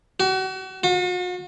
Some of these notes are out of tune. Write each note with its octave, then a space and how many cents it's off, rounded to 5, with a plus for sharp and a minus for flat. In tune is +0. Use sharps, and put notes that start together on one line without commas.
F#4 +35
F#4 -45